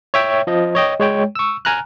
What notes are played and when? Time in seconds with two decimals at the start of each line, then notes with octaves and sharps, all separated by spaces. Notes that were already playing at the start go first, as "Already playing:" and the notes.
0.14 C#5 E5 G5
0.47 F3 D#5
0.75 C#5 D#5 G5
1.00 G#3 C#5 G5
1.35 C#6 E6
1.65 G#5 A#5 F6 F#6